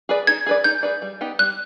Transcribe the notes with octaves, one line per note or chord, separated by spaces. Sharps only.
G#4 B4 D5
D#4 G#6
G#4 B4 D5
D#4 G6
G#4 B4 D5
G3
B3 D#4 G4
G3 F#6